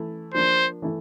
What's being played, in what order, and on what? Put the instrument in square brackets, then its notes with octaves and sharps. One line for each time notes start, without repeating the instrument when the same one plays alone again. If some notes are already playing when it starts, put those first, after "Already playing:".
Already playing: [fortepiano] E3 A3 E4
[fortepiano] F3 A#3 D4 [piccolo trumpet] C5
[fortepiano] E3 A3 E4